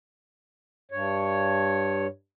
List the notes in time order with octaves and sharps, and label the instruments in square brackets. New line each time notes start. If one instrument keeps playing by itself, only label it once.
[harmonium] G2 C#5